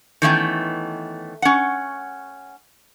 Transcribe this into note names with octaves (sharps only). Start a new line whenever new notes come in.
D#3 E3 A3 B3 C#4 G5
C#4 F#5